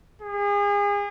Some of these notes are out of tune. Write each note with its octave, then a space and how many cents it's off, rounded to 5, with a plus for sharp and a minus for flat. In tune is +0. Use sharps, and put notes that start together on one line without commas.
G#4 -35